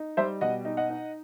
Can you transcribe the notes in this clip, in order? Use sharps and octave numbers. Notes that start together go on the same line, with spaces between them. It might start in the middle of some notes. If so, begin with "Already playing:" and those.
Already playing: D#4
G3 C5 E5
B2 D#5 F#5
D#4
D#5 F#5
D#4